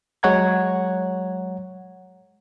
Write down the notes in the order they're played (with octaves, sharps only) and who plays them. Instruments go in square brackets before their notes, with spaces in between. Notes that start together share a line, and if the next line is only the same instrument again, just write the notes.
[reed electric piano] F#3 G#3 C#5 F#5 A#5 G#6